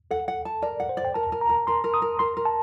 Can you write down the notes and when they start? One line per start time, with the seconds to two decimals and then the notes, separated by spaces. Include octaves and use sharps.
0.11 A4 F#5
0.28 F#5
0.45 A5
0.62 A#4 D5
0.80 F#5
0.89 C5
0.97 D5
1.05 G5
1.14 A#4 A5
1.32 A#4
1.41 A#5
1.49 A#4
1.67 A#4 C6
1.84 A#4
1.94 D#6
2.02 A#4
2.19 A#4 C6
2.37 A#4
2.45 A5